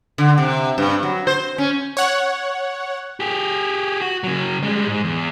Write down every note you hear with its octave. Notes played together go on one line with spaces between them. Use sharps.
D3
C3
G2
F#3
C5
C#4
C#5 F#5
G4 G#4
F#4
C#3 F#3
G3 G#3
G#2
E2